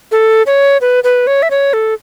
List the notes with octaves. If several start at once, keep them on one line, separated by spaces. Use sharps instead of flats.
A4
C#5
B4
B4
C#5
E5
C#5
A4